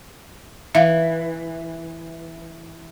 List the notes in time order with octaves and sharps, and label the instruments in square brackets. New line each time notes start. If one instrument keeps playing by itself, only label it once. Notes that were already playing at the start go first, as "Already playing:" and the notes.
[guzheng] E3 [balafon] E5 F5